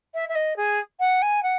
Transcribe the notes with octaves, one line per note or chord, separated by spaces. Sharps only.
E5
E5
D#5
G#4
F#5
G#5
F#5